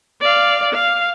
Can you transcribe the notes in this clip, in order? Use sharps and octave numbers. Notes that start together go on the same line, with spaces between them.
D5 F5
F5